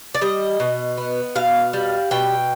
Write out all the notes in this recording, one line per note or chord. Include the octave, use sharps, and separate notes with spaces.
D5
G3 D#5
B2
B3
B2 F5
G3
B2 G5